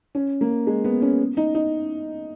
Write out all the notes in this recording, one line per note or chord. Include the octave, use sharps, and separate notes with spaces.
C#4
A#3
G#3
B3
C#4
D#4
D#4